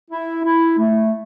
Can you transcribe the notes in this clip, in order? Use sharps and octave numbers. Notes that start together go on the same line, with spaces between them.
E4
E4
A3